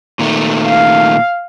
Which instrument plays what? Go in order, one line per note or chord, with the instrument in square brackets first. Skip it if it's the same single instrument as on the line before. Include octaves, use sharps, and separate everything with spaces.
[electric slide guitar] A#2 D#3 A3
[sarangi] F5